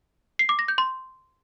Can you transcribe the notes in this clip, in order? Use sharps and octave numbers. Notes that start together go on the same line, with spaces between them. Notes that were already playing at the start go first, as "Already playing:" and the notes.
C7
D6
A#6
G6
C6